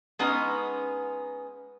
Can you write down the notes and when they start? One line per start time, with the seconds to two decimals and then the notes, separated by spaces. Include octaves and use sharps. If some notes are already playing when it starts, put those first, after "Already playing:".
0.19 G#3 B3 C#4 D#4